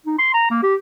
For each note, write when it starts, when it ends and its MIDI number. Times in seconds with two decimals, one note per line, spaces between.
0.06 0.16 63
0.18 0.32 84
0.33 0.50 82
0.50 0.62 58
0.63 0.75 67